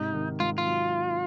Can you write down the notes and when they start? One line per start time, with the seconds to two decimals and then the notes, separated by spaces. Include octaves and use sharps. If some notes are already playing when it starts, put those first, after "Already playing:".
Already playing: G#2 C3 D#4
0.14 D#3
0.40 G#2 F4
0.58 F4
0.66 F#3